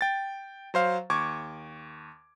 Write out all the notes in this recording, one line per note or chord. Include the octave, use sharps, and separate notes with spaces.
G5 A6
F#3 C5 F5
D#2 C#6 D6 G#6